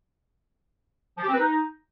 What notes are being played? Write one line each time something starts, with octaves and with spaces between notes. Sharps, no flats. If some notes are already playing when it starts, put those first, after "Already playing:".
F3
G4
C4
B4
D#4